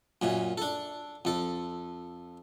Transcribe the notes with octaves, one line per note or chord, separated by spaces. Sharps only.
F#2 A#2 C#4
D4 A4
F2 A4